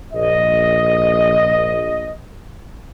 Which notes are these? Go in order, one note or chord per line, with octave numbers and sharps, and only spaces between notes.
A#1 D#5